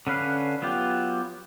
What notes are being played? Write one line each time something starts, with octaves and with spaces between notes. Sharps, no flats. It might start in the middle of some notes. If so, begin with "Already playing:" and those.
D3 C#4 B4 F5
F#3 B3 F4 G4